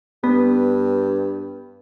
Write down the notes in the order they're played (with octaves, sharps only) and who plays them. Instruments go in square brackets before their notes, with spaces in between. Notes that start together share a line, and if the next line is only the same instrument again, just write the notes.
[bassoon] G2 [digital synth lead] B3